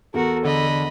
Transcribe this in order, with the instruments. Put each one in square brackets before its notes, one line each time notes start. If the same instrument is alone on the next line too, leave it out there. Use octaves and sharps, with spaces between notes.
[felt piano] E2 [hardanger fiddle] F#4 A#4 [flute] A4
[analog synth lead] D3 [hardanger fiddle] D#5 B5